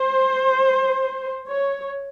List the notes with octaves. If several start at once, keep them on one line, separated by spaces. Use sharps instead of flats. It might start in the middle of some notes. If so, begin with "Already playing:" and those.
Already playing: C5
C#5